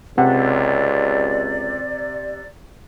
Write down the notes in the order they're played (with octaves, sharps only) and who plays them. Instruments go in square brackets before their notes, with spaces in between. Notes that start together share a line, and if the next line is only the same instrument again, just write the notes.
[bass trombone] C#2 [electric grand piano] C3 [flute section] D5 [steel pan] F#5